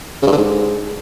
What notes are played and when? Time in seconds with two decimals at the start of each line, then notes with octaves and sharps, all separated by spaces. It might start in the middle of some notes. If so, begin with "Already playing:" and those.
0.22 C#3
0.27 G2
0.32 D3
0.37 G#2